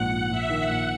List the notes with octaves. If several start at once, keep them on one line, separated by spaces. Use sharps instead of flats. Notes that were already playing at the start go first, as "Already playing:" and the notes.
Already playing: A#1 G#2 F#5
A#1
A#1 E5
D#3
F#5
A#1